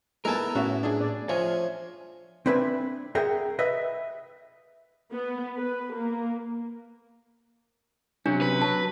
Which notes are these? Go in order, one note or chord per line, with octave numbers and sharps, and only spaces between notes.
G#3 B3 E4 A4 A#4 G#5 A5
A2 C#4 F#4 E5
D4 G#4
D5
F3 C#5 E5 F5 G#5
C4 D4 B4 E5 G#5
G#4 A#4 E5 F#5 G5
B4 D#5 E5
B3
B4
A#3
C3 F#3 C#4 D4
B4
F#3 A5